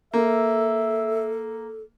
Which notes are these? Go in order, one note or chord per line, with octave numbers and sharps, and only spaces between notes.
A#3 A4 E5